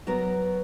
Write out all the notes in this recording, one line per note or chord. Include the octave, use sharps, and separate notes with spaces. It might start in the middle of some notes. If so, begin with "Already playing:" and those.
F#3 B3 F#4 A#4